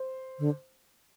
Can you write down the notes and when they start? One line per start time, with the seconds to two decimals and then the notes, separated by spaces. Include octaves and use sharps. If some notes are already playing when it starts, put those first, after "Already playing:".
Already playing: C5
0.39 D3